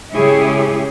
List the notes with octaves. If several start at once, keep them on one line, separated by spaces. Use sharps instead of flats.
C#3 G#3 E4 G4 G#4 C#5